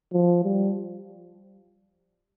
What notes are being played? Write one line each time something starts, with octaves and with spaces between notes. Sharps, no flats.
F3
G3